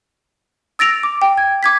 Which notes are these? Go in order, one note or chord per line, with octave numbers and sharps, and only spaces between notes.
E6 A6 A#6 D7 F7
D6
G5
G#6
D6 G#6 B6